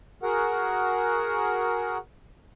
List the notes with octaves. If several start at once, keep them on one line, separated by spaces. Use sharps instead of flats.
F#4 G#4 A#4 F#5